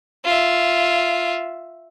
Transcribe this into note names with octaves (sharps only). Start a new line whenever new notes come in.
F4 E5